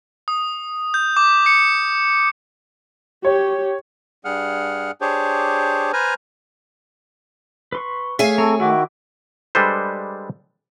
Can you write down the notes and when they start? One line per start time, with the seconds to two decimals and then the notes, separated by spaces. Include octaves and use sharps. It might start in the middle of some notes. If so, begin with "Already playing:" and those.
0.28 D#6
0.94 G6
1.17 D6
1.46 C#7
3.25 G4 C#5
4.25 G2 G3 G#4 F#5 F6
5.01 D4 G4 G#4 C5 C#5
5.93 B4 C5 G#5 A#5 F6
7.72 B4 C6 C#6
8.19 A3 G#4 C#5 E5 F5 G#5
8.38 C4 A4 A#5 C#6
8.60 D#3 E4 F#4 E5 D6
9.55 G3 G#3 D4 A4 B4 C5